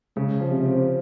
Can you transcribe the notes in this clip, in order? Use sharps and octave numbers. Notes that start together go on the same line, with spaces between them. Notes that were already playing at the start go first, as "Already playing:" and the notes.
C#3 G#3
F3
C3
C4